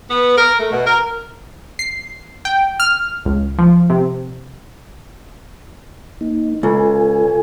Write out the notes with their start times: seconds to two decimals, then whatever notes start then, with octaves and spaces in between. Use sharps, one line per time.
0.10 B3
0.38 A#4
0.59 A3
0.72 B2
0.86 A#4
1.79 C7
2.45 G5
2.80 F6
3.25 C#2
3.58 F3
3.90 C3
6.21 A#3 D#4
6.63 C#2 F4 A4 G#5